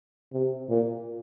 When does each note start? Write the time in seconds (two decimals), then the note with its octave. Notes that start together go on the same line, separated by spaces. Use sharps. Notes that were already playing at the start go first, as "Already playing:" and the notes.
0.33 C3
0.69 A#2